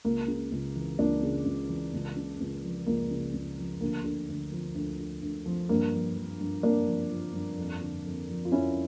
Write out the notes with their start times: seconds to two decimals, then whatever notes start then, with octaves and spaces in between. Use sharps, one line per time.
0.04 C#2 A#3
0.28 C#3
0.52 C#2
0.76 E3
0.99 C#2 A#3 D4
1.23 C#3
1.45 C#2
1.69 E3
1.93 C#2
2.17 C#3
2.40 C#2
2.63 F3
2.86 C#2 A#3
3.11 C#3
3.33 C#2
3.58 F3
3.81 D2 A#3
4.04 D3
4.29 D2
4.52 F3
4.75 D2
4.99 D3
5.22 D2
5.46 F3
5.69 G2 A#3
5.93 F3
6.17 F3
6.41 G2
6.63 G2 A#3 D4
6.87 F3
7.11 F3
7.34 G2
7.57 F2
7.81 D3
8.05 F2
8.29 F3
8.45 F4
8.52 F2 C#4 E4